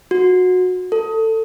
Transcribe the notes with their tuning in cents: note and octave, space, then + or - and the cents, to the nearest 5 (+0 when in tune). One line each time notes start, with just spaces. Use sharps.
F#4 -20
A4 +20